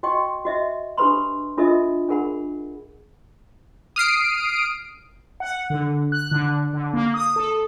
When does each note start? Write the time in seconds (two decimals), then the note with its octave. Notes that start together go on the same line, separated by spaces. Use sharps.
0.03 F#4 D#5 G5 C6 C#6
0.45 F#4 D#5 E5
0.98 D4 G4 A4 B4 B5 C6
1.57 D4 F4 A4 A#4 D#5 E5
2.09 D4 G#4 A#4 F#5 B5
3.96 D#6 F6 C7 D7
5.40 F#5
5.70 D3
6.12 F#6
6.31 D3
6.73 D3
6.93 A#3
7.14 D#6
7.36 A4